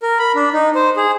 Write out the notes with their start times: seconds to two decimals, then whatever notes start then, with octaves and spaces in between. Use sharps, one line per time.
0.03 A#4
0.19 B5
0.35 D4
0.53 D#4
0.75 C5
0.97 G#4